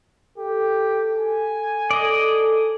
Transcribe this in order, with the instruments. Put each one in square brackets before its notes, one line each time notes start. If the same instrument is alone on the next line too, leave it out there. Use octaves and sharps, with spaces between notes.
[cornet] G4 [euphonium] A4
[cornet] G#5
[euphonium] A4 [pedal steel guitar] D5 D#5